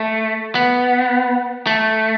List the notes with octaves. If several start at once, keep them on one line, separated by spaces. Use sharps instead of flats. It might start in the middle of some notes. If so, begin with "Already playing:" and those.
Already playing: A3
B3
A3